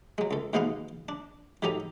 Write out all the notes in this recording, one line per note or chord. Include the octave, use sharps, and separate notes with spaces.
F#3 G#3
C#2 A4
D#2 B2 G#3 B3 F5 F#5
D4
G#2 F#3 G4 A4 D#5 A#5